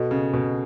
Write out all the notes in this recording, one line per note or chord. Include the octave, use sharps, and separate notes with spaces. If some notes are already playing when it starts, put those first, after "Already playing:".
Already playing: B2 F#4 A4 D#5
C#3
B2